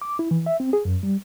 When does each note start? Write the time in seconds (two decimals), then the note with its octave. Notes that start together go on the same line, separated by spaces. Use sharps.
0.02 D6
0.19 E4
0.31 E3
0.46 E5
0.60 C4
0.73 G#4
0.85 F#2
1.03 G3